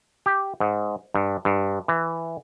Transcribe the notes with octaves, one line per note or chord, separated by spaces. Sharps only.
G4
G#2
G2
G2
E3